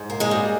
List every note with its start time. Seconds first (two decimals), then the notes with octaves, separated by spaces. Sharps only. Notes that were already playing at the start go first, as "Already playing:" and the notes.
Already playing: G#2
0.10 A#3
0.20 G#3 G#4
0.31 G3